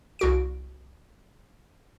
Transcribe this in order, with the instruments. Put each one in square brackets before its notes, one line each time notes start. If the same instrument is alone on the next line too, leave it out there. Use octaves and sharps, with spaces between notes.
[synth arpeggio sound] C2 F#4 D7